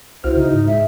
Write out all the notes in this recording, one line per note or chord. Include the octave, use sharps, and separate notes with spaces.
C2 E4 F#4 C5 F6
C#3 D#4
G#2
G#3 E5